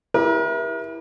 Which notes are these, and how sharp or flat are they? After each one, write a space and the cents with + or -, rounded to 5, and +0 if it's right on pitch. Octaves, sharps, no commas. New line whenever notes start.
E4 +0 G4 +25 A#4 +40